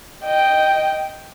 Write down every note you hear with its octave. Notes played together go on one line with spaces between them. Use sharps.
D#5 G5